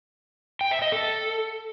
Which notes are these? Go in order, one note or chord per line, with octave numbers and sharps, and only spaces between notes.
G5
E5
D#5
A4